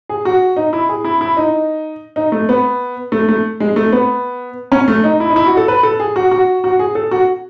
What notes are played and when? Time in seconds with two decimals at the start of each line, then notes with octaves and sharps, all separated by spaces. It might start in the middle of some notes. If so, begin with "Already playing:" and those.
0.09 G#4
0.25 F#4
0.56 D#4
0.73 E4
0.89 G#4
1.04 E4
1.21 E4
1.37 D#4
2.16 D#4
2.32 A3
2.49 B3
3.12 A3
3.29 A3
3.60 G#3
3.76 A3
3.92 B3
4.72 C#4
4.88 A3
5.04 D#4
5.20 E4
5.30 D#4
5.36 E4
5.46 F#4
5.57 A4
5.68 B4
5.83 A4
6.00 G#4
6.16 F#4
6.31 F#4
6.64 F#4
6.79 G#4
6.95 A4
7.11 F#4